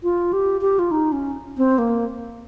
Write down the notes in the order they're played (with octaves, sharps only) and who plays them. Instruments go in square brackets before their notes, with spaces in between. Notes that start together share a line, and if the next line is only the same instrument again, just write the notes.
[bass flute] F4
G4
G4
F4
D#4
C#4
C4
A#3